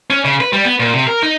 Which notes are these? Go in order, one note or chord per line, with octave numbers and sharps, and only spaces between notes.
C#4
C#3
B4
G3
B3
A#2
C3
A#4
D#4